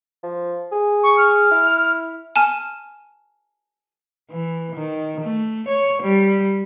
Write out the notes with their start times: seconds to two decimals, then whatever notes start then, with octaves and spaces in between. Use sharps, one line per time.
0.23 F3
0.72 G#4
1.03 C#6
1.17 F6
1.51 E4
2.36 G#5 A5 F6
4.31 E3
4.75 D#3
5.21 A3
5.68 C#5
6.03 G3